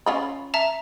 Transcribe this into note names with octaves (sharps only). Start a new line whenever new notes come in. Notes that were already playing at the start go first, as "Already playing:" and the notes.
C#4 F4 B5
E5 A5 A#5